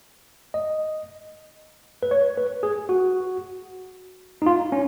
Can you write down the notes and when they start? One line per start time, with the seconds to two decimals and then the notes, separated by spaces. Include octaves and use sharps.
0.54 D#5
2.03 B4
2.11 C#5
2.37 B4
2.63 G#4
2.89 F#4
4.42 D#4
4.46 F4
4.72 C#4